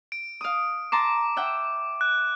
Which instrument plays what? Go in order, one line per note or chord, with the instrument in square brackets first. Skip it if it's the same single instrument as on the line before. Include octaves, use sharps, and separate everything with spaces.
[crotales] D7
[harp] F5 D#6
[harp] A5 A#5 C6 [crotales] D6
[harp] E5 F#5 G5
[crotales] F#6